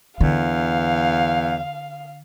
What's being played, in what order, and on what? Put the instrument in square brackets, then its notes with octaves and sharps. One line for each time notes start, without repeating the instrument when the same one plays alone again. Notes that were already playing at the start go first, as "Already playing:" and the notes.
[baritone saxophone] E2 [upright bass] D3 [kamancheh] F5